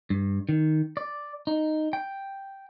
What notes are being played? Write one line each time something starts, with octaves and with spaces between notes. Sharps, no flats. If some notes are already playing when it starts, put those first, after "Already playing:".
G2
D#3
D5
D#4
G5